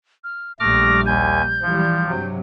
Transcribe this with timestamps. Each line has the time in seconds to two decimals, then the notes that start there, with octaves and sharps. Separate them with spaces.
0.24 F6
0.60 A#1 G3 A3 D6 F6 A#6
1.06 D#2 G#5 G6
1.62 E3 F3 G3
2.06 G2 C3 F#3